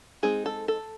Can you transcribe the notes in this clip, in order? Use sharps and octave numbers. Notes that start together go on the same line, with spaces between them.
G#3 C4 D#4 G#4
A4
A4